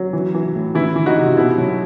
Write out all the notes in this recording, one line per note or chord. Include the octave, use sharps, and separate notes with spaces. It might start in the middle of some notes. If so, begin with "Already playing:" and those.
Already playing: F#3
E3
E3
A2
E3 E4
E3
D#4 F#4
C3
B2 E4
F#3